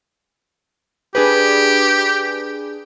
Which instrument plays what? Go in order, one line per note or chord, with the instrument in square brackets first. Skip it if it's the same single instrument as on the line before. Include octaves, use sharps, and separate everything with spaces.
[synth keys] D4 G#4 B4 [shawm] G4